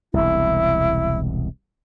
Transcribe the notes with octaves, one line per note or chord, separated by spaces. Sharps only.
E1 C2 E4